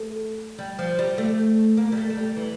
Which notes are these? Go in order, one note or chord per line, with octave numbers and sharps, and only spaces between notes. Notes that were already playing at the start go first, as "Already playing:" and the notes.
Already playing: A3
G3
F3
G3
A3
A#3
G3
A3
A3
G3
E3